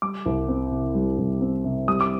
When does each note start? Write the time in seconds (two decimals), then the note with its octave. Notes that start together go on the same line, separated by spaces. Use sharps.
0.02 G3 D6
0.26 C2
0.48 C4
0.71 C3
0.95 G3
1.18 C2
1.41 C4
1.64 C3
1.88 G3 D#6
2.01 D6